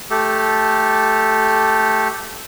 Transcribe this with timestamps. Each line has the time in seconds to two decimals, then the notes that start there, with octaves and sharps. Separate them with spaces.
0.10 A3 G4 A4